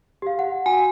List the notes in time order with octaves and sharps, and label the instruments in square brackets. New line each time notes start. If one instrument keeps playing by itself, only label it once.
[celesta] G4 F5
F#5
[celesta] F#4 [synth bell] G#5